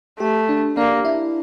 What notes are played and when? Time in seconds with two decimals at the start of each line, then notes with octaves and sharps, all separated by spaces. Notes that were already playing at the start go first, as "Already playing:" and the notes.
0.20 A3 G4
0.49 D4
0.77 A#3 D4
1.05 E4